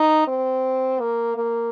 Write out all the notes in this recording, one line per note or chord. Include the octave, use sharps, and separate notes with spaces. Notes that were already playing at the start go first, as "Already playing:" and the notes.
Already playing: D#4
C4
A#3
A#3